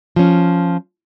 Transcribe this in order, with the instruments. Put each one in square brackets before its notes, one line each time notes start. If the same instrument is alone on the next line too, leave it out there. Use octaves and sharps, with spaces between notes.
[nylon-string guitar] F3 C#4